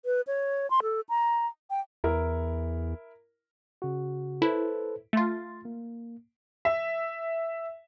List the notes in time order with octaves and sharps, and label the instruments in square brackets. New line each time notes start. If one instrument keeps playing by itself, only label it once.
[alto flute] B4
C#5
C6
A4
A#5
G5
[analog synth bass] E2 [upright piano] E4 A#4
[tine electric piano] C#3 F#4
[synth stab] E4 [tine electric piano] A4 B4 C5
[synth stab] A3 F4 [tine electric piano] C6 A6
[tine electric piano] A#3
[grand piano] E5